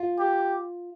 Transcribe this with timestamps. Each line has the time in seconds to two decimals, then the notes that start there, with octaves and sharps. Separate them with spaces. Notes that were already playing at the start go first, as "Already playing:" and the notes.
Already playing: F4
0.19 G4